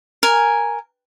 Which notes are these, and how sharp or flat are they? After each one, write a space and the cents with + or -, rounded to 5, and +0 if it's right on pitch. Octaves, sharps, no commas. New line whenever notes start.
A#4 +0 G#5 +0